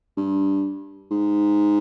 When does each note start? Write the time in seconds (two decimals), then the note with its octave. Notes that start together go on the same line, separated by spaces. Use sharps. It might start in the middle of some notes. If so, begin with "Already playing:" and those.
0.17 G2
1.11 G#2